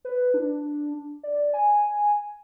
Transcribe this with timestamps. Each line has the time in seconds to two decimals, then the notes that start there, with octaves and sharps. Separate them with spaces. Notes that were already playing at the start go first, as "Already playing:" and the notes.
0.05 B4
0.34 D4
1.23 D5
1.54 G#5